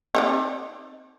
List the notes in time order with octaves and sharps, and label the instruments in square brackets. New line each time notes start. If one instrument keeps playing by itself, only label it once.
[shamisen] C4 D#4 D5